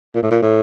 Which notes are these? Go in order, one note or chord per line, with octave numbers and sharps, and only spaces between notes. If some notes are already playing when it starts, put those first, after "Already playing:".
A#2
A2
A#2
A2